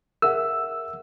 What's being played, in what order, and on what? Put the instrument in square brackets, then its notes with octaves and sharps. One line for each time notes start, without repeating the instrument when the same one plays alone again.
[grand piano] G#4 E5 F#5 [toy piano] A#4 [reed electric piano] E6